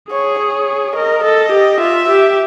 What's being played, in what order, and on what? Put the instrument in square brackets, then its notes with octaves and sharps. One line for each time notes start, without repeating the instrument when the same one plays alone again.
[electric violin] G#4 [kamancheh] C#5
[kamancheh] C#5
[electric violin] A#4 [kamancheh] D#5
[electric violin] A4 [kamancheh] D#5
[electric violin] G4
[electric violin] F4 [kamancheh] E5
[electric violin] G4